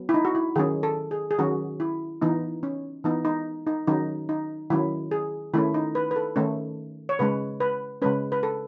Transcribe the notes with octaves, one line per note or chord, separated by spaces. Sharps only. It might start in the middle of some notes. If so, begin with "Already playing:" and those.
Already playing: F#3 B3
E4
D#4
F#4
E4
D#3 F#3 C#4 G#4
A4
G#4
G#4
D#3 F#3 C#4 F#4
E4
E3 B3 D#4
C#4
E3 B3 D#4
D#4
D#4
D#3 F#3 C#4 D#4
D#4
D#3 F#3 C#4 E4
G#4
D#3 A3 C#4 E4
D#4
B4
B4
A4
D#3 A3 C#4
C#5
C#3 G#3 C#4 B4
B4
C#3 G#3 C#4 B4
B4
A4